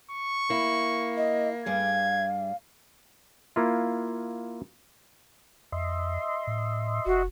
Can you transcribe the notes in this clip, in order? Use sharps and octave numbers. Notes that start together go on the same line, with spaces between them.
C#6
A#3 E4
D#5
G2 G3 G#4 F5 G#6
A#3 E4 F4
F2 D#5 E5 C6
A2
F1 F#4